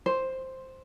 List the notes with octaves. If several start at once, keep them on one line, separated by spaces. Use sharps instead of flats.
C5